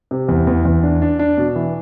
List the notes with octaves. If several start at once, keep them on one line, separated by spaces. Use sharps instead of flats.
C3
E2
E2
E2
D4
D4
D4
B2
E3